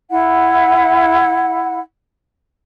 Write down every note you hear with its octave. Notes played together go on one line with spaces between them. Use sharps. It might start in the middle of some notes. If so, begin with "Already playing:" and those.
E4 F#5